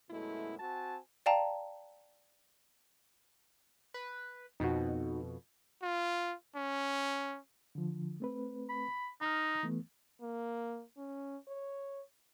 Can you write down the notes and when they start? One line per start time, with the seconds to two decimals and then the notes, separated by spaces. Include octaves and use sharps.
0.10 F#2 B2 G#3 A3 E4
0.60 C4 F#4 G#5 A5
1.26 D5 F5 G5 A5 A#5
3.94 B4
4.60 F2 B2 D#4 F#4
5.82 F4
6.56 C#4
7.75 D3 F3
8.20 A3 C4 B4
8.69 B5
9.21 D#4 A#5 F6
9.63 E3 A3 B3
10.21 A#3
10.97 C#4
11.48 C#5